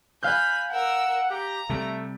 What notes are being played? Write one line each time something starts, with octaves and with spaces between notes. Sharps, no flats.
F5 G#5 B5 F#6 G6
A#4 F#5 E6
G4 A#5
C3 G3 A3